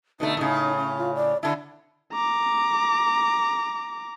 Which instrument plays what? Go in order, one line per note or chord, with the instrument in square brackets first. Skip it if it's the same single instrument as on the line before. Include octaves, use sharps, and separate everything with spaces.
[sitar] B2 D3 A3 [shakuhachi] D#4
[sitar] A2 C#3 [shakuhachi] D#4
[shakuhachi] C#4
F4
D5
[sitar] D3 E4 [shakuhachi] A5
[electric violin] A#5 D6